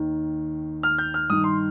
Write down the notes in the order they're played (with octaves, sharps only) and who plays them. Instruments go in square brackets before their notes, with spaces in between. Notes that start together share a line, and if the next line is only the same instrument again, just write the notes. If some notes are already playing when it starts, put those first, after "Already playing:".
Already playing: [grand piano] D#2 D#3
F6
G6
F6
G2 D#3 D#6
C6